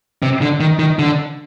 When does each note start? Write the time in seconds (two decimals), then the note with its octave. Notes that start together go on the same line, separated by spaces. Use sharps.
0.23 C3
0.42 D3
0.60 D#3
0.79 D#3
0.99 D3